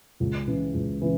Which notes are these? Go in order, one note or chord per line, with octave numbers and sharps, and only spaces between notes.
C#2
C#3 E3
C#2
C#3 E3